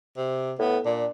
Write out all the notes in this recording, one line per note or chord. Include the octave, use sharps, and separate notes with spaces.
C3
A2 B3
A#2 D4